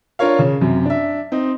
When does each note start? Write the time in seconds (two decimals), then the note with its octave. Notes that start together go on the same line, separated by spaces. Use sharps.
0.19 D4 F4 A#4 C#5 F5
0.39 C#3
0.61 F#2 C3
0.86 D4 E5
1.32 C4 D#4